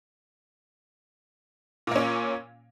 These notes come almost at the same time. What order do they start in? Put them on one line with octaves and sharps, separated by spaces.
A#2 A#3 C#4